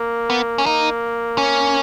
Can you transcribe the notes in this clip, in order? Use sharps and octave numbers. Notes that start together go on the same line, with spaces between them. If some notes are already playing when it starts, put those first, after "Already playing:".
Already playing: A#3
B3
C#4
A#3 D#4
C#4